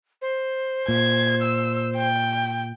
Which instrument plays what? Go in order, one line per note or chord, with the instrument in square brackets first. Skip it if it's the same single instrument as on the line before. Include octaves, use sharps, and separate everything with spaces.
[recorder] C5
[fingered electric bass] A#2 [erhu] G#6
[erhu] E6
G5